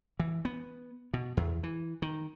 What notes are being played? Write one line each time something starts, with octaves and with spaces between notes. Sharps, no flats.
E3
B3
B2
E2
E3
D#3